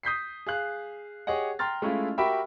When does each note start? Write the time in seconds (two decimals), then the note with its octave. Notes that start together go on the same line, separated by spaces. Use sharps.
0.03 D#6 G6 B6 C7
0.46 G#4 F5 F#6
1.27 G4 G#4 C#5 D#5 F#5
1.59 G5 A#5 C6 F6 A6
1.82 G#3 A3 C#4 E4 F4
2.18 F#4 G4 A#4 E5 G5 B5